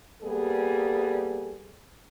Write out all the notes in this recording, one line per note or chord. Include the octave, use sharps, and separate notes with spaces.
G3 A#3 B3 G#4 A4